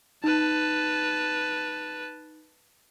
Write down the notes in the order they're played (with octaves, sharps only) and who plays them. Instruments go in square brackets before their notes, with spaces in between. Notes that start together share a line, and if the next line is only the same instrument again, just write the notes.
[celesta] D#4 [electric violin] B4 A5